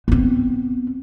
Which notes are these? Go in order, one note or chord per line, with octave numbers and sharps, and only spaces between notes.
B3 C4